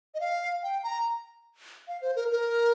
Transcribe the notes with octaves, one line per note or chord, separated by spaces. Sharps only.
D#5
F5
G5
A#5
F5
C5
A#4
A#4